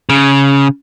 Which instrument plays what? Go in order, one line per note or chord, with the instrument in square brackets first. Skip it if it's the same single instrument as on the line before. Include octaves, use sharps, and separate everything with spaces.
[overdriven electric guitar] C#3